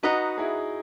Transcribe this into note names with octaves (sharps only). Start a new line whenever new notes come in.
D#4 F#4 B4 D#5 F#5 A#5
E4 G#4